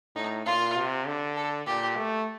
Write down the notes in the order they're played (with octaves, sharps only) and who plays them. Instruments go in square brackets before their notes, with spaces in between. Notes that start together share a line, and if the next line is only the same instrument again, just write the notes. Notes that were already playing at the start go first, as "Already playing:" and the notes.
[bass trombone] A2 [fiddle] D#4
[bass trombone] A#2 [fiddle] F4
[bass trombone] C3
D3
[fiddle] A4
[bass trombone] A#2 [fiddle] G4
[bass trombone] A3